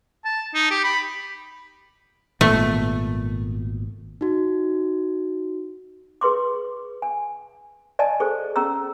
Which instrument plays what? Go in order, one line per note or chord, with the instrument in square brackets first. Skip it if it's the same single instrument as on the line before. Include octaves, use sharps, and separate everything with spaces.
[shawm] A5
D#4
G4
B5
[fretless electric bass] G#1 A#2 B3 [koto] A3
[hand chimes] D#4 F#4
[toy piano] G#4 B4 C6 D6
G#5
D5 D#5 G#5 A5
G#4 A4 C5
C#4 G#4 A#5 E6